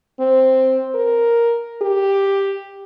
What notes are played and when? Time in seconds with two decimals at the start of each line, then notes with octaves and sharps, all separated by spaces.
0.20 C4
0.95 A#4
1.82 G4